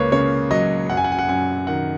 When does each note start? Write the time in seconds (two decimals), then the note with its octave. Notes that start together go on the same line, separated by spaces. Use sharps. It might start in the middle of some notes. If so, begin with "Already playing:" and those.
Already playing: C#2 A#3 B4 C#5
0.12 C#3 C#5
0.51 F#3 D#5
0.90 F#2 F#5
0.97 G#5
1.04 F#5
1.12 G#5
1.19 F#5
1.28 F#2 G#5
1.67 D#3 F#5